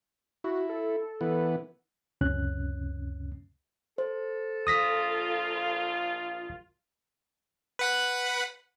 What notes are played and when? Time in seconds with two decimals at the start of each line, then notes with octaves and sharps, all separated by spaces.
0.44 E4 F#4
0.69 A4
1.21 E3 B3
2.21 C#2 F#2 C3 C#4 F#6
3.98 A4 C5
4.67 A#1 F4 D#6 A#6 B6
7.79 B4 F#5 B5